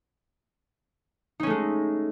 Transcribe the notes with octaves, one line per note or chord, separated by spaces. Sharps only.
G#3 A3 C#4 D#4